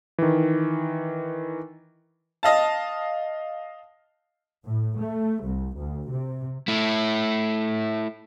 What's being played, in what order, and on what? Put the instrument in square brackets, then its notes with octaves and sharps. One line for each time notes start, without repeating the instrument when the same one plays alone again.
[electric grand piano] D#3 E3
[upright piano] D#5 F5 A5
[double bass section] A2
A3
C2
D2
C3
[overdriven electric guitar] A3 E4